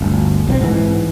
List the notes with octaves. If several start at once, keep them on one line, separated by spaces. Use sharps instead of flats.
G1 D2
B1 F3 C4
G#2 E3